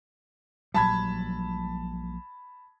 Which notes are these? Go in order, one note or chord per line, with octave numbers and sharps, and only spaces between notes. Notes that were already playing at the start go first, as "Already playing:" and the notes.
A#1 F#3 G3 A5 B5 G#6